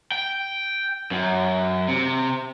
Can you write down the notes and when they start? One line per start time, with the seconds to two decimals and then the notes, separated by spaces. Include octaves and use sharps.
0.12 G5
1.11 F#2
1.88 C3